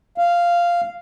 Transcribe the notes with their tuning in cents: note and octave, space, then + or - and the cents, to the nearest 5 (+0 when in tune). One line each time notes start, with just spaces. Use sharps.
F5 -5